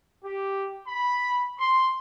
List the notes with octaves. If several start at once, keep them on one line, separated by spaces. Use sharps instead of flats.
G4
B5
C6